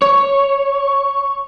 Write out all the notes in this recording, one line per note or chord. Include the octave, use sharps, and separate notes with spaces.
C#5